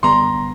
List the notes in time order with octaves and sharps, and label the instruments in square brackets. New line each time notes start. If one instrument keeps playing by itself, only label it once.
[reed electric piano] F#2 D3 G3 B3 [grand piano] A#5 C6